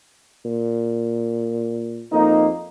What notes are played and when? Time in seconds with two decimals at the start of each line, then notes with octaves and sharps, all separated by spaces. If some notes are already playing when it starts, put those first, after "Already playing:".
0.45 A#2
2.12 F2 A#3 D#4